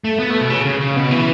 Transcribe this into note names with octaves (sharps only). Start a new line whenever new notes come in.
A3
B3
A3
B2
C#3
C#3
C#3
B2
E3